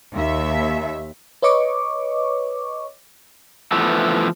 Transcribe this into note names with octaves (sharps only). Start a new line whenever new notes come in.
D#2 E5
B4 C#5 D#5 C#6 D6
E3 F3 A3 B3